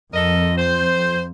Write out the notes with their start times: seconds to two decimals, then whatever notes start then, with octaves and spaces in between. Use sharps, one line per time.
0.14 F2 A4 A#4 D#5
0.57 C5